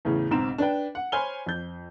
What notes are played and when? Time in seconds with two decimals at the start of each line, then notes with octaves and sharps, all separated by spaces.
0.05 E2 A2 C#3
0.31 B1 G#2 C#3 C4 A#5 E7
0.58 D4 B4 G5
0.95 F#5
1.12 C5 C#5 G#5 B5 F6 G7
1.46 F2 G6